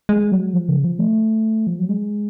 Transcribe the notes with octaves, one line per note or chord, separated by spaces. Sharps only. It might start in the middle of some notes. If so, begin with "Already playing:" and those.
G#3
F#3
F3
C#3
F3
A3
F3
F#3
G#3